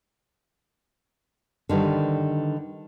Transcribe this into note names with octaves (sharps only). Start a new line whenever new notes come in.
D3 D#3 G3 B4